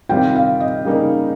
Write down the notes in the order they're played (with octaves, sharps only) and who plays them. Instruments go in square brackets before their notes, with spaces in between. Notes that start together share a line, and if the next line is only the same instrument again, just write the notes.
[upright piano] C3 D#3 G3 C4 F4 [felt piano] G5
[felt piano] F5
D#5
[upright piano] C#3 G3 A#3 D#4